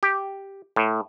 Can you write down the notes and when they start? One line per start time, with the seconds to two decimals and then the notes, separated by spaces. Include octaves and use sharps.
0.03 G4
0.76 A2